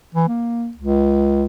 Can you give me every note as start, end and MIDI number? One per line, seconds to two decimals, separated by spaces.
0.15 0.28 52
0.28 0.70 58
0.77 1.46 37